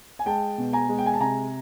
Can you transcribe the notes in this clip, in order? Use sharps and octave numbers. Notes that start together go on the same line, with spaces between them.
G#5
G#3 G5 A5
B2
G#5 A#5
G#3
G5
G#5
A5
C3 G#5 A#5